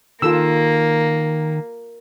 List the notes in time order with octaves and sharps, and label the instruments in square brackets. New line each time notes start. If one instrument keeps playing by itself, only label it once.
[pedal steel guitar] D#3 [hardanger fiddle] A#3 [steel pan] F4 A4 E6